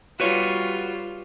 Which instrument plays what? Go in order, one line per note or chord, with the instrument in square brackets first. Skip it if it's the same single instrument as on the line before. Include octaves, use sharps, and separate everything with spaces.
[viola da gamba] G3 F4 [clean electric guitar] F#4 B4 C#5